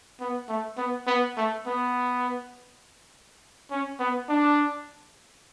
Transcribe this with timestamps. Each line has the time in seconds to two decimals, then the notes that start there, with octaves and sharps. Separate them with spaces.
0.20 B3
0.48 A3
0.77 B3
1.07 B3
1.37 A3
1.66 B3
3.71 C#4
4.00 B3
4.29 D4